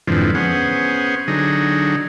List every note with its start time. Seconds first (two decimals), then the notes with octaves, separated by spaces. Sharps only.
0.07 F2 G#2 D3 E3 F3
0.35 B3 C#4 G#4 C5 F#5
1.28 D3 F#3 D#4 G#4